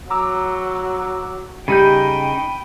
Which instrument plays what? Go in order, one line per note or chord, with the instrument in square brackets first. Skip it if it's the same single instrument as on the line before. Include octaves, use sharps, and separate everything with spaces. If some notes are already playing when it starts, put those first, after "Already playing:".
[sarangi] F#3 [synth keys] A#5 D6 E6
[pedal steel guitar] C#3 D#4 G6 [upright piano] G3 [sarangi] G5 [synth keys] B5 D#7